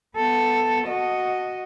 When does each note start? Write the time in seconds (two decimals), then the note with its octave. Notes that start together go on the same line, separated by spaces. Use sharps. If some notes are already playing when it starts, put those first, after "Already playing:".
0.16 B3 A4
0.87 F#4 D#5